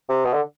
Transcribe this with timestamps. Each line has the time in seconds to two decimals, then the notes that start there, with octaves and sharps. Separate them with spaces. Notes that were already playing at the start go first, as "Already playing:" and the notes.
0.09 C3
0.25 B2
0.33 D3